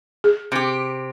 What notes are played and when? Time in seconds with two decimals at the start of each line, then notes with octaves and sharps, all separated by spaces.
0.24 G#4
0.52 C3 G4